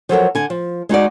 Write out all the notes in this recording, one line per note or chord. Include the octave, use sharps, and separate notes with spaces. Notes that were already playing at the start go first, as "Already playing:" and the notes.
F3 F#3 A4 A#4
D3 G#5
F3
G#3 D#4 F#4 D5